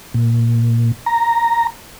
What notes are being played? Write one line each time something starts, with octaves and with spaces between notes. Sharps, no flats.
A#2
A#5